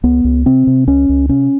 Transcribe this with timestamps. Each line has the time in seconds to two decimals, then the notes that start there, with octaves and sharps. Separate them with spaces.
0.03 C#2 B3
0.24 C#2
0.46 C3 C4
0.67 C3
0.87 C#2 C#4
1.09 C#2
1.29 C3 C#4